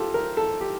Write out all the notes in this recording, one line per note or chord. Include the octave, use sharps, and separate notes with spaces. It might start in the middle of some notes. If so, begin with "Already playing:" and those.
Already playing: F4 G4 A4
A#4
A4
G4